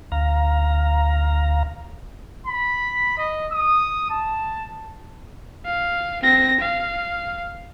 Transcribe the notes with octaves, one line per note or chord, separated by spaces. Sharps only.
D2 F5 A#5
B5
D#5
D#6
A5
F5
C4 A#6
F5